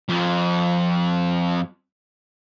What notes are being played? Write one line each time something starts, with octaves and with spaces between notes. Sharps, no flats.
F2 F3